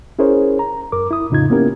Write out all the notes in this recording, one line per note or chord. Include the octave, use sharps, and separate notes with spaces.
C#4 E4 G#4 A#4 C5 C#5
A#5
F#2 A#4 D6
E4 D#6
F2 A2 C#3 D#4 F4 G#6
A#3 B3 C#4 E4 G4 A#4